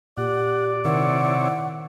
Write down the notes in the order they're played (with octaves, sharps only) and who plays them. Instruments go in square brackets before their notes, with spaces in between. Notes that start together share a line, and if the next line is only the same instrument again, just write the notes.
[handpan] A#2 [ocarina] G4 [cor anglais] D5 [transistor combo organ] F#5
[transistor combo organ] C3 E4 C#5 [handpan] D#3 [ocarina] F#5